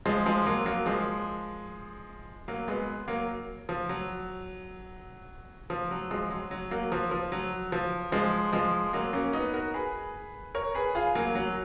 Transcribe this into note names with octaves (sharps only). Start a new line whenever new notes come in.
F3 G#3
F3 G#3
F#3 A#3
F#3 A#3
F3 G#3
F#3 A#3
G#3 B3
F#3 A#3
F3
F#3
F3
F#3
F3 G#3
F#3
F#3
F#3 A#3
F3
F3
F#3
F3
F3 G#3
F3 G#3
F#3 A#3
A#3 C#4
B3 D#4
F#4 A#4
G#4 B4
A#4 C#5
G#4 B4
F4 G#4
F#3 A#3
F#3